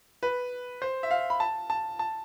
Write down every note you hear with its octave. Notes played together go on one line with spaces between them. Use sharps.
B4
C5
E5
F5
B5
A5
A5
A5